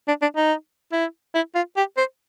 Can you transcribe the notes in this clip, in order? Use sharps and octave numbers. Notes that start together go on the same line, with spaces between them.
D4
D4
D#4
E4
E4
F4
G4
C5